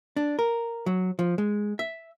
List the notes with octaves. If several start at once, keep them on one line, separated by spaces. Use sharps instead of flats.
D4
A#4
F#3
F3
G#3
E5